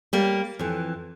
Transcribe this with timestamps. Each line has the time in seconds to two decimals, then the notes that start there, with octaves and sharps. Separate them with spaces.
0.13 G3 A#3
0.59 F2 E3